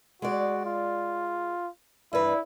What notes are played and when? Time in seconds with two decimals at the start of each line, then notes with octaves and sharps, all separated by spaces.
0.22 G#3 F#4 D5
0.65 F4
2.13 G2 E4 B4